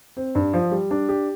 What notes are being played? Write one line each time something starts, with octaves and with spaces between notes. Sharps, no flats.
C4
G2
F3
G3
D4
G4